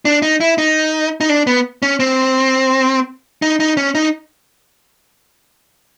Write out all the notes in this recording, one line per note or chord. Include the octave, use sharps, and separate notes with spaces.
D4
D#4
E4
D#4
D#4
D4
B3
C#4
C4
D#4
D#4
C#4
D#4